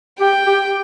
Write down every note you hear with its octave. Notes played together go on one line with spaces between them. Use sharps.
G4 G5
G4